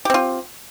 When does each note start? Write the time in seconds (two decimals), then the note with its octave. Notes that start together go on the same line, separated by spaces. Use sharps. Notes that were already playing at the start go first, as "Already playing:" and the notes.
0.05 G4
0.10 C4
0.14 F4